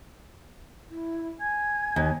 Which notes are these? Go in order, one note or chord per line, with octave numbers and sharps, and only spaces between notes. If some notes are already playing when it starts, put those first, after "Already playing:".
E4
G#5 G#6
D#2